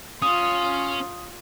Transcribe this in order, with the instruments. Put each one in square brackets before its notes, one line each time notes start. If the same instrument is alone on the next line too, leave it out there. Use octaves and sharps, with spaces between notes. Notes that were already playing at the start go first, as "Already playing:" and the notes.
[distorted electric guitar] C#4 [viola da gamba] F4 [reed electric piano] D#6